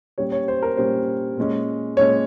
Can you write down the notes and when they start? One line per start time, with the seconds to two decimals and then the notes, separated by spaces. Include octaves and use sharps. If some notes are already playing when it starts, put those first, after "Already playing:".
0.18 A#2 G3 C#4 C#5
0.32 C#5
0.48 C5
0.62 A#4
0.77 A#2 G3 C#4 C5
1.37 A#2 G#3 C#4
1.97 A#2 G#3 C#4 C#5